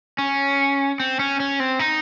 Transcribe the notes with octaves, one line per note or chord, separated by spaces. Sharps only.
C#4
C4
C#4
C#4
C4
D#4